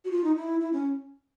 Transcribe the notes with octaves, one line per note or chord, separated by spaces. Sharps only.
F#4
F4
D#4
E4
E4
C#4